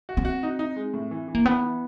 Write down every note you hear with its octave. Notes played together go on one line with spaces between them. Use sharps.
F#4
C4
F#4
D#4
D#4
G#3
A2
E3
E3
A#3
E3 B3
E3